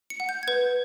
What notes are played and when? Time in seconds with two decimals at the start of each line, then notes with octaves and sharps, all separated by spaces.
0.10 C#7
0.20 F#5
0.29 G6
0.43 G#6
0.48 B4 G6